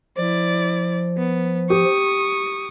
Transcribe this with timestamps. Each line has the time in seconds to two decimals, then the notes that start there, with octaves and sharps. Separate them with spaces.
0.17 F3 E4 D5
1.17 B3
1.70 G4 C#6 D#6